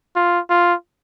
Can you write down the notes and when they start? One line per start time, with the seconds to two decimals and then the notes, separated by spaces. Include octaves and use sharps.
0.16 F4
0.50 F4